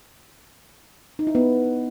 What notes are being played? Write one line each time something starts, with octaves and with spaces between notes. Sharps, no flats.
D#4
E4
B3